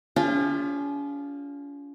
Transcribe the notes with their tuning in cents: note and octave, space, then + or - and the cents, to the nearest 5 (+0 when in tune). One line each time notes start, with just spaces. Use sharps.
C#4 +45 F4 +0 G#4 -45